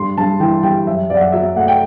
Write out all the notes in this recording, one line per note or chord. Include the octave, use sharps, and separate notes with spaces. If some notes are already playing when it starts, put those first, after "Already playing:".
Already playing: G2 G3 C6
G2 A5
E3 G5
G3 G5
F#2 E5
F#2 D5
F#5
E5
F#3 E5
E5
A3 F#5
G5